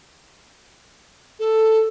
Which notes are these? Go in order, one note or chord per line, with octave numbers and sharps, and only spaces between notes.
A4